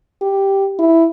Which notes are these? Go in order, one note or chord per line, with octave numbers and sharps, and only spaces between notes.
G4
E4